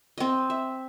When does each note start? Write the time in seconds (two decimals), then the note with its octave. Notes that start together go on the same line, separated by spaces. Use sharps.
0.18 C4 D#5
0.50 E5